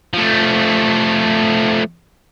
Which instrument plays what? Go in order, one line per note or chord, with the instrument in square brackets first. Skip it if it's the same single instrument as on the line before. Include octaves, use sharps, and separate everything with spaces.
[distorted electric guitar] F3 A3